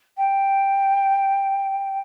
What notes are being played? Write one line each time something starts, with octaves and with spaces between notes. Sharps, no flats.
G5